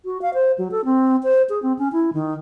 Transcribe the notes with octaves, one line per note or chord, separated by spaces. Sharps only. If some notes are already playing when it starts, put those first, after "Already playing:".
F#4
F5
C5
F#3
A4
C4
C5
G#4
C4
C#4
E4
D#3